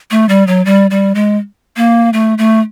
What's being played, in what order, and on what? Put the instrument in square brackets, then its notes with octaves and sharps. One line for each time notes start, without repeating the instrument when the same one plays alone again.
[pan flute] A3
G3
F#3
G3
G3
G#3
A#3
A3
A3